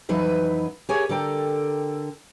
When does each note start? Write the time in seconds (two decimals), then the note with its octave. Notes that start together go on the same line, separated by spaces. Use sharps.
0.09 F2 E3 F#3 D#4 B4 E5
0.89 G4 G#4 A#4 C#5 E5 G#5
1.09 D3 A4 A#4 D5 G5 A#5